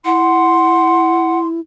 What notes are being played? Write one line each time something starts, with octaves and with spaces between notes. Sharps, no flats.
E4 F#5 C6